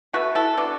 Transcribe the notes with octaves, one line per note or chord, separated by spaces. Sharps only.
B2 A3 F#4 B4
E4 A4
D3 B3 D4 F#4